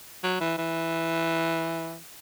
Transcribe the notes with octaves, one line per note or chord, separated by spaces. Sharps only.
F#3
E3
E3